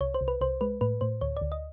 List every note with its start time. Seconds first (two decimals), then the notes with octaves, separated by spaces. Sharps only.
0.01 C2 C#5
0.14 C5
0.21 C2
0.28 B4
0.41 C2 C5
0.61 G#3 B4
0.81 A2 B4
1.01 A2 C5
1.21 D2 C#5
1.37 D2 D5
1.52 D#5